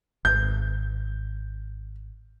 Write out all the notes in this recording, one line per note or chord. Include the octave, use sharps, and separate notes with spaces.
G#1 G6